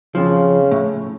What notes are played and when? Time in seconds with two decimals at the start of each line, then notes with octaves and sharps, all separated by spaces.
0.15 F2 C#3 F3
0.71 A2